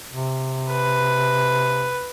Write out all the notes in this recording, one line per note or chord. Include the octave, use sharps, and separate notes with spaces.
C3
B4